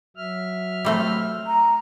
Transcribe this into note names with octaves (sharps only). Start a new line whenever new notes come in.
F#3 E5 F6
G3 A3 C4
A#5